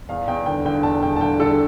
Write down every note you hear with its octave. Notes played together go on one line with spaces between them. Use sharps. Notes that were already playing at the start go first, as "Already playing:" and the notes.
E2 F5
E2 G5
D3 G5
D3 G5
E2 A5
E2 G5
A5
D3 G5
D3 A4